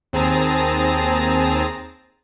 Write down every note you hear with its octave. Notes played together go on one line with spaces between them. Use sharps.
D#2 C4 G#4 A5 A#5 A#6